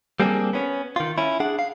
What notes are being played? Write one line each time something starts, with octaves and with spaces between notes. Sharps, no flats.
G3 A#3 C4 D4 G#4
B3 C#4
D#3 F4
C#4 E4
D4 G#4 F#5
F5